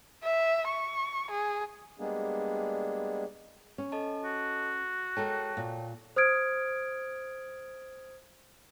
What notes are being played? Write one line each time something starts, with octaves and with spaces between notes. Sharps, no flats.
E5
C#6
G#4
G3 G#3 A#3 B3 D4 G#4
C#4
A4 D#5 A5
F#4
G#3 A4 A#4 C#5 G5 A5
A#2
C5 D#6 F6 G#6 D7